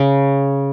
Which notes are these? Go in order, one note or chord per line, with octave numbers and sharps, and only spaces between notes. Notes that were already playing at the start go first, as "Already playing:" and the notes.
Already playing: C#3